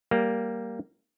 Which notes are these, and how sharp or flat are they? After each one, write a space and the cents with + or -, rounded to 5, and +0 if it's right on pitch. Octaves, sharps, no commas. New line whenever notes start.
G3 +0 A#3 +0